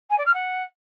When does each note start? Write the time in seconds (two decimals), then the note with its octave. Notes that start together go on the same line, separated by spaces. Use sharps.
0.10 G#5
0.17 D5
0.25 F6
0.33 F#5